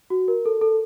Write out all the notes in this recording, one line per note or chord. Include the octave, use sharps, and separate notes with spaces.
F#4
A#4
A4
A4